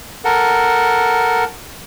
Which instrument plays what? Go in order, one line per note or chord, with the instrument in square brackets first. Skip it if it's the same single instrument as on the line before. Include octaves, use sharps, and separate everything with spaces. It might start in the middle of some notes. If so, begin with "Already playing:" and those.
[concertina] A4 A#4 F#5